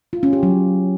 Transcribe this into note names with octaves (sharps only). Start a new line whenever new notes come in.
F4
C#4
G4
F#3